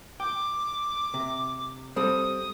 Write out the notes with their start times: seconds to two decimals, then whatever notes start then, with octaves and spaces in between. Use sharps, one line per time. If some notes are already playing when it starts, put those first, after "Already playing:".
0.20 G5 D6
1.14 C3
1.96 G3 C4 A4 D#6